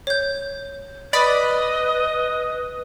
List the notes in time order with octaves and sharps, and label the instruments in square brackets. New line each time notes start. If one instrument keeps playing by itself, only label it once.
[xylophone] C#5 G6
[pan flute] B4 [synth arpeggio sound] D5 B5 [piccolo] D#5